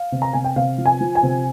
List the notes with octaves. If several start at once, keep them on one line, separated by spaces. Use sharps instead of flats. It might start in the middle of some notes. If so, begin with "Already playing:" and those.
Already playing: F5
C3
A#5
C3 G#5
G5
C3 F5
F3
G#5
F3
G#5
C3